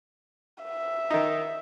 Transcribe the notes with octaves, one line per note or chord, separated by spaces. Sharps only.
E5
D#3 D#4